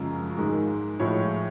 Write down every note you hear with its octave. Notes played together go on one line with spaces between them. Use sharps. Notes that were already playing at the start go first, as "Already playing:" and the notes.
Already playing: F#2 C#3 F3 G#3
G#2 D#3 G#3
A2 F3 G#3 C#5